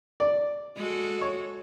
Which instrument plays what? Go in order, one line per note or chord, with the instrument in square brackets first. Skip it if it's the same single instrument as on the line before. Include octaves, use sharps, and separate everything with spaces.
[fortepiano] D5
[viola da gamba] G#3 F#4 A4
[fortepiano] C#5